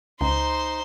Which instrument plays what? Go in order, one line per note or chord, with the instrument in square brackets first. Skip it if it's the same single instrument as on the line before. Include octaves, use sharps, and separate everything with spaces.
[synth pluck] C#2 [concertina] D#4 [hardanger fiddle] C5 C6